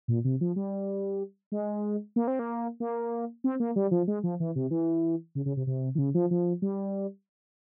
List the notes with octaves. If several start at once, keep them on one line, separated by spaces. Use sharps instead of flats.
A#2
C3
F3
G3
G#3
A#3
C4
A#3
A#3
C4
A#3
G3
F3
G#3
F3
E3
C3
E3
C#3
C#3
C3
C3
E3
C#3
F3
F3
G3